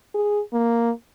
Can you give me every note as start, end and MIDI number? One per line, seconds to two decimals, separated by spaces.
0.14 0.41 68
0.53 0.91 58